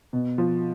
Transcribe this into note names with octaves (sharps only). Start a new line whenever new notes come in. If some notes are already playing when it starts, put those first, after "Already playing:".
B2
F3